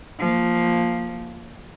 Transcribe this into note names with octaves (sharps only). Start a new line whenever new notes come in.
F3 A#3